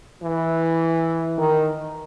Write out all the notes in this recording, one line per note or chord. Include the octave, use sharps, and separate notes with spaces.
E3
D#3